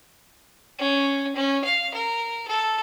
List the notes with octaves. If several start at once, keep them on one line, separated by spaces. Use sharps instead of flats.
C#4
C#4
F5
A#4
A4